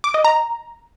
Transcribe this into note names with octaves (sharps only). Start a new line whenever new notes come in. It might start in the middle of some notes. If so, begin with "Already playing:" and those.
D6
D#5
A#5